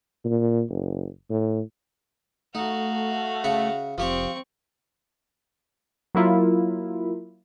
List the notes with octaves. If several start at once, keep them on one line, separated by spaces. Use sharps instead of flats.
A#2
F#1
A2
A3 D#4 F#4 F5
C#3 E5 F#5
F1 F3 C4 G4 G5 C#6
F#3 A#3 E4 F4